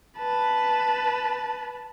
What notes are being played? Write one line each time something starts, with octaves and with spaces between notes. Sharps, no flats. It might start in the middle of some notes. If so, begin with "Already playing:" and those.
B4 A5